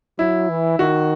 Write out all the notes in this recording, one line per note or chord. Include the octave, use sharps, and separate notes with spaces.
F#3 E4
E3
D#3 F#4